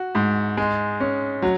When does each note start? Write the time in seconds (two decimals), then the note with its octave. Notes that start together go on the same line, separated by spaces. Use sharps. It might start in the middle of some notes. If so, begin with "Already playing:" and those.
Already playing: F#4
0.15 G#2
0.57 G#3
1.00 C#4
1.42 F#3